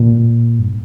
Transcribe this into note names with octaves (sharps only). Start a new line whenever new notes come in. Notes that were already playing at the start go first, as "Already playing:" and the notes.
Already playing: A#2
G2